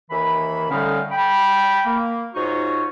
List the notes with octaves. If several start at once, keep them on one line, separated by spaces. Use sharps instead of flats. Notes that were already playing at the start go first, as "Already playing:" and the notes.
D#2 E3 E5 B5
A2 D3 G3 C#4 D#4 F5
G5 B5
A#3
G#2 D#4 F4 F#4 C#5 C#6